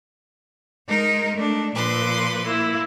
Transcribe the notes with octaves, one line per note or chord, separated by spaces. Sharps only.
G#3 D#4 A#4
A3 D4
A#2 F3 B4 C6 D6
A#3 E4